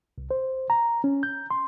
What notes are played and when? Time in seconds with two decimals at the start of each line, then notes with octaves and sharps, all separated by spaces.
0.18 C2
0.31 C5
0.70 A#5
1.04 C#4
1.23 G6
1.51 C6